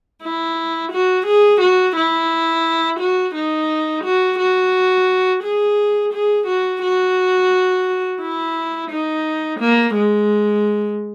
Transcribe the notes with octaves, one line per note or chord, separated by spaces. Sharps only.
E4
F#4
G#4
F#4
E4
F#4
D#4
F#4
F#4
G#4
G#4
F#4
F#4
E4
D#4
A#3
G#3